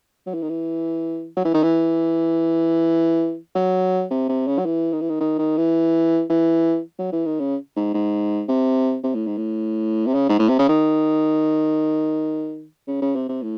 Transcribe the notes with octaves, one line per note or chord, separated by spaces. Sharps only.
F#3
E3
D#3
E3
F#3
E3
D#3
E3
F#3
C3
C3
C#3
F#3
E3
D#3
E3
D#3
D#3
D#3
E3
E3
F#3
E3
D#3
C#3
G#2
G#2
C3
C3
A2
G#2
A2
C3
C#3
G#2
A2
C3
C#3
D#3
C#3
C#3
C3
C3
A2